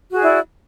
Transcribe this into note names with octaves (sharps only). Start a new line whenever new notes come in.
E4 F#4 G#4 D5